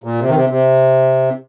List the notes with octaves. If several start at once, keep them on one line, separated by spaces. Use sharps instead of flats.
A#2
C3
D#3
C3
C3